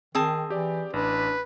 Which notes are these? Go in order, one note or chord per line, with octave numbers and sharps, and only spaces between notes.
D#3 C4 G#4 A5
E3 G4 D5
A1 D4 B4